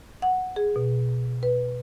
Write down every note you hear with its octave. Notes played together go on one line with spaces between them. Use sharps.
F#5
G#4
B2
B4